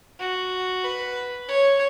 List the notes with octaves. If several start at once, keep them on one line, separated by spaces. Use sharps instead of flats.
F#4
B4
C#5